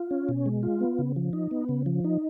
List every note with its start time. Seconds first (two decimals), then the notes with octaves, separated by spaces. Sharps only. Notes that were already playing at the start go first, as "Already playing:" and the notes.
Already playing: F4
0.11 C#4
0.29 B2
0.46 G#3
0.63 F4
0.81 B3
0.99 C#3
1.16 F3
1.33 D#4
1.51 B3
1.69 C#3
1.86 F3
2.04 D#4